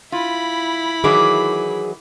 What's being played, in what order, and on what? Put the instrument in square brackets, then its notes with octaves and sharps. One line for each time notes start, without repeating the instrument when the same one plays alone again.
[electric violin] E4 B5 [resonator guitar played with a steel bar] F4
[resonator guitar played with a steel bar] D#3 E3 F#3 [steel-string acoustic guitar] G#4 [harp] D6